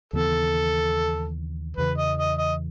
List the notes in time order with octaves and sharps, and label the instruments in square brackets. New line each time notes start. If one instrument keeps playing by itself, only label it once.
[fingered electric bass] D#2 C#3 E3 B3 [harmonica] A4
[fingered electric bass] E2 C#3 E3 [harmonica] B4
[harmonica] D#5
D#5
D#5